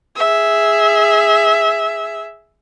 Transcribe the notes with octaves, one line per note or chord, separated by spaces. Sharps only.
G#4 E5